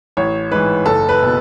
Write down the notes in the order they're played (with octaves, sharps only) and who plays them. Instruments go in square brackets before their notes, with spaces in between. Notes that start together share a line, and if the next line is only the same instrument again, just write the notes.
[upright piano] A1 C#5
G#2 E3 B4
F#1 A4
B4
B2